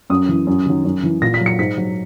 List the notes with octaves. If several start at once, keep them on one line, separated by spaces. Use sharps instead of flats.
F#2 D#6
E3
F#2
D#3 F#3
F#2
E3
A#2 A#6
B6
F#3
C#7
G#2 B6
F#3